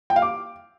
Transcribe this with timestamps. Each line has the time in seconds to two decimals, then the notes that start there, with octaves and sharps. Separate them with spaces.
0.10 G5
0.16 F5
0.22 D6